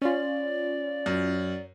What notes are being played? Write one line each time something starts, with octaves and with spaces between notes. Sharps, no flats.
C#4 F4 D5
F#2